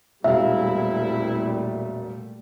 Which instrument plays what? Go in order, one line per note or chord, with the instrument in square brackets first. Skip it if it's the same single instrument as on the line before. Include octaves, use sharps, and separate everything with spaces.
[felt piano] E1 F5 [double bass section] A#2 G3 A3 [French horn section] C4 E4 [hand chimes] E5